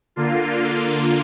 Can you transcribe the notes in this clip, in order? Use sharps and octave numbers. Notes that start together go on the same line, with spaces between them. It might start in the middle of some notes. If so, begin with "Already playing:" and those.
D3 A#3 F4